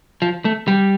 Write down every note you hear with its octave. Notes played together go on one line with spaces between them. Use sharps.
F3
A3
G3